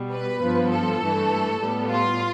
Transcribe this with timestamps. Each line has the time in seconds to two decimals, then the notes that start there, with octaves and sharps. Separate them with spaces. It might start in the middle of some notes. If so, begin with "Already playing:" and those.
Already playing: B2 G3 B3
0.12 B4
0.42 G2 F3 B3
0.72 A4
1.01 G2 E3 A3
1.60 A2 G3 B3
1.90 F4